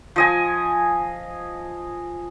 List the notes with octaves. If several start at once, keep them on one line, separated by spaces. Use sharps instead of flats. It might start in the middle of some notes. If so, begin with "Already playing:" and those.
F3 D#5 G#5